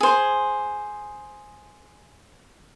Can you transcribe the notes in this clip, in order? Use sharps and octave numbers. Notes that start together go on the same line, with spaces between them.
G#4 C5